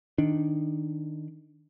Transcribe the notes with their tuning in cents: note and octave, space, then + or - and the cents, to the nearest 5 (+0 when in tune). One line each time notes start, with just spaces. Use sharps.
D#3 +0 D4 +0